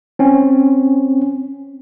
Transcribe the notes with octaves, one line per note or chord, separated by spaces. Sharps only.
C4 C#4